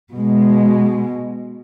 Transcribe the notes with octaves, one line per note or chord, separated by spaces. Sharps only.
B2 G#3